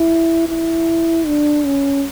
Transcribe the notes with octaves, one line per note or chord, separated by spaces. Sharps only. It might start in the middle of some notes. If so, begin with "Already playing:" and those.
Already playing: E4
E4
D4
C#4